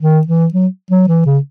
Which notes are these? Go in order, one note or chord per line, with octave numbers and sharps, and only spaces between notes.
D#3
E3
F#3
F#3
E3
C#3